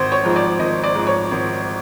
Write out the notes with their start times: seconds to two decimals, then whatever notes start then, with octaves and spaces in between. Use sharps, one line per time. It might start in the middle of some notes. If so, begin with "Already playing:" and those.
Already playing: G#1 C5
0.12 C#5
0.23 G#2 F3
0.36 D5
0.59 G#1 D#5
0.83 D5
0.95 G#2 F3
1.07 C#5
1.31 G#1